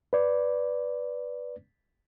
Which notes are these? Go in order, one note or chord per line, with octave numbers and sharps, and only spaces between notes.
B4 D5